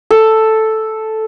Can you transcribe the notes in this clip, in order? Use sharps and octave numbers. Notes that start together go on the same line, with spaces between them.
A4